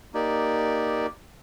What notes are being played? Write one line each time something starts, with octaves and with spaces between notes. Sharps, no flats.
A#3 D#4 G4 D5